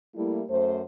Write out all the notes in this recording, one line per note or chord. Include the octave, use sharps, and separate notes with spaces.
G3 A3 A#3 E4
F#2 A3 C5